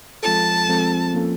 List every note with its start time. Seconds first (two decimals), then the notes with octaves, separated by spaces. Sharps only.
0.23 F3 G#3 C4 F4 A4 A5
0.68 F3 G#3 C4 F4 A4
1.14 F3 A#3 C#4 F4 A4